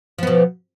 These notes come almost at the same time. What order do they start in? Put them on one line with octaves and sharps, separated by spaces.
F3 B3 B2